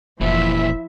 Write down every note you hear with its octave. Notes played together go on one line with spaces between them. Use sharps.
F1 A#2 E3 F3 E4 E5